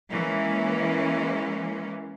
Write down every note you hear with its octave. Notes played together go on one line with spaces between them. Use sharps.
E3 G#3 A#3 C#4